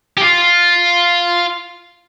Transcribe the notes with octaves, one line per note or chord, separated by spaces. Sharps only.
G4
F4